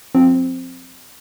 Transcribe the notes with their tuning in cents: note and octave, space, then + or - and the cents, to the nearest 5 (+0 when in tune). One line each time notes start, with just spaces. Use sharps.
F3 +25 C4 +0